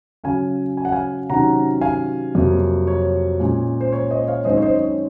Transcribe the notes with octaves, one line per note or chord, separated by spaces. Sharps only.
C#3 F#3 C#4 F5 G#5
G#5
F#5
F5 G#5
C3 D#3 F#3 C#4 F#5 A#5
F5 G#5
F2 C3 F#3 A#3
C#5
A#2 G#3 C#4
C5
C#5
C5 D#5
C#5 F5
F#2 D#3 G#3 C4 D#4 C5 D#5
C#5
C5 D#5
C#5